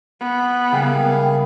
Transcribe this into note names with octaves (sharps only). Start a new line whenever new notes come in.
B3
C#3 G3 A#3 E4 G#4 F5 G5